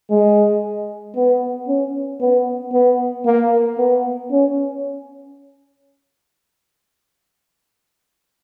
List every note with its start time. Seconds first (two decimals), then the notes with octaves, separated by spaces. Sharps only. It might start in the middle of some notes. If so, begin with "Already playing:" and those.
0.10 G#3
1.15 B3
1.68 C#4
2.20 B3
2.72 B3
3.25 A#3
3.78 B3
4.31 C#4